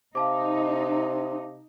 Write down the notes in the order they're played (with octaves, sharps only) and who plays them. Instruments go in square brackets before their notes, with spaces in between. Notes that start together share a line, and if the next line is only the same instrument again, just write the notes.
[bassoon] C3 [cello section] D#4 [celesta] F5 A5 D6